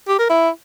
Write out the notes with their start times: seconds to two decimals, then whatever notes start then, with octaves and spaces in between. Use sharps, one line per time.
0.08 G4
0.19 A#4
0.29 E4